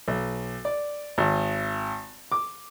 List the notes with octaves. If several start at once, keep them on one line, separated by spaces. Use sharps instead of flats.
B1
D5
G#1
D6